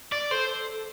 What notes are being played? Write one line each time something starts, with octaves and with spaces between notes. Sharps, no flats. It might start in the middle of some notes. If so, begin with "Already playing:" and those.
D5
A4 C5